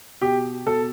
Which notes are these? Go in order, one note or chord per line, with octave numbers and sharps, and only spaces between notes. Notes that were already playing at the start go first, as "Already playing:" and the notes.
B2 G4
B2 A4